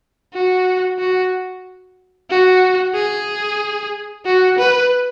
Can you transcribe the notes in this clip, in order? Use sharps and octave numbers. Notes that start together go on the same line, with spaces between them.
F#4
F#4
F#4
G#4
F#4
B4